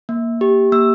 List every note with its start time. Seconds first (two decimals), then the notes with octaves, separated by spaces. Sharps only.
0.09 A#3
0.41 G4
0.72 A#3 E6